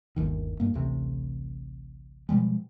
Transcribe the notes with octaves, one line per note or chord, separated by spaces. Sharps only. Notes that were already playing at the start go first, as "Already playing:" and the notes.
G1 D#2 D#3
G2 A#3
A1 D2 C3
B2 F3 G3 G#3